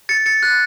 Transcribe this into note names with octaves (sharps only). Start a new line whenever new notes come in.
A6 C#7
A6 C#7
F#6 A6